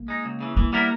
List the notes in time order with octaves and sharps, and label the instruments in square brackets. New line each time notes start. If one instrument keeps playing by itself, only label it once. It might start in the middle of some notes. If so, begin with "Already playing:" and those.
Already playing: [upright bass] A#3
[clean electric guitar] G#3 D#4
C#2
C#3 E3
[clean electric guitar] E3 [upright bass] A#3
[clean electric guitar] G3 B3 E4 A#4